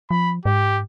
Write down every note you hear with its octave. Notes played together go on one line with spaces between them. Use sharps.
F3 B5
G#2 G4